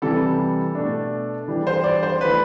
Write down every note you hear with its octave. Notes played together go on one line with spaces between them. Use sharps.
C3 E3 G3 A4
B2 A3 D4
E3 G3 D4 G4
C5
D5
C5
E3 A3 D4 B4